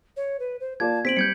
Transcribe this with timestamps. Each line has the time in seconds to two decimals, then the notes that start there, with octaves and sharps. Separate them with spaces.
0.17 C#5
0.40 B4
0.60 C5
0.80 A#3 F4 D5 A5 G#6
1.05 C4 C5 B6 D7 F#7
1.17 G3 G6 G#6 C#7